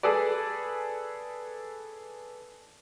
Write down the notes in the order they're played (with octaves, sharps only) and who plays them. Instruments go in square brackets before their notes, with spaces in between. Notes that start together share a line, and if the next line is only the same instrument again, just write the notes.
[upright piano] G#4 A4 B4 D5